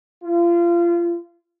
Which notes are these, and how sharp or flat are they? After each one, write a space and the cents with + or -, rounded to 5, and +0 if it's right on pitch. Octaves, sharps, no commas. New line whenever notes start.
F4 -30